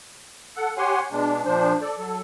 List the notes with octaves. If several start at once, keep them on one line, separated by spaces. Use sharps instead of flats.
A4 F#5
G4 C#5 F#5 G#5 C6
B2 G#3 D4
A#2 F3 D4 C5
A4 D5
F#3 A4